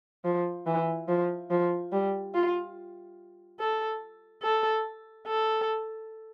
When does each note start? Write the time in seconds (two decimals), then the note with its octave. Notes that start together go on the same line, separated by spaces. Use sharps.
0.25 F3
0.66 E3
1.08 F3
1.50 F3
1.92 G3
2.34 F4
3.59 A4
4.43 A4
5.27 A4